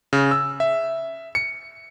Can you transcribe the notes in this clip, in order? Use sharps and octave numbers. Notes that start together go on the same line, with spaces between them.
C#3
E6
E5
C#7